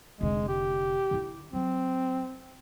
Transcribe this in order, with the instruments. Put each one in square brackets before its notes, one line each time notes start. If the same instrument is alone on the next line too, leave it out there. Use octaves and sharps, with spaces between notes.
[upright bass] F1 D3 [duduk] G#3
[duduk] G4
[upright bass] D3 E4
[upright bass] F#3 [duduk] C4